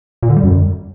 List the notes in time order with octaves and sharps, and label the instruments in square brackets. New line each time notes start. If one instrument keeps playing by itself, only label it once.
[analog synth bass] A#2
D3
G3
F#2